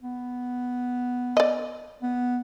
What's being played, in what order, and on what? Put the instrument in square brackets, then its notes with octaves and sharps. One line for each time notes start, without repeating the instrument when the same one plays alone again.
[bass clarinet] B3
[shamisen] D5 D#5
[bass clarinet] B3